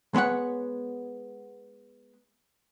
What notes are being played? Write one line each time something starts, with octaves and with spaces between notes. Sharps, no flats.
G#3 B3 C#5 F#5